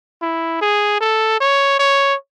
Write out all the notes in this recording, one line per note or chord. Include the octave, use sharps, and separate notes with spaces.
E4
G#4
A4
C#5
C#5